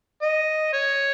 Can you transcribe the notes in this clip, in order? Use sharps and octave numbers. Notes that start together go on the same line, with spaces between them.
D#5
C#5